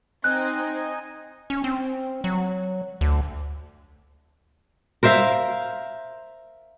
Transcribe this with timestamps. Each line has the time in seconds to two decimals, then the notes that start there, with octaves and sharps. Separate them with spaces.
0.24 C4 D#4 D#5 G#5 F#6
1.50 C#4
1.64 C4
2.24 F#3
3.01 D2
5.03 A#4 C5 E5 F5